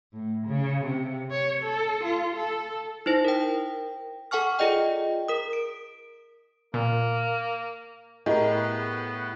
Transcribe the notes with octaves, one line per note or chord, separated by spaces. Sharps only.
A2
C#3
C3
C#5
A4
F4
A4
D#4 E4 C5 A#6
A#4 G5
A4 F#5 G#5 C#6 F6
F4 G#4 D5 D#5 G5
A#4 D#6
D7
A#2 A#3
A2 G4 G#4 A#4 D#5
B3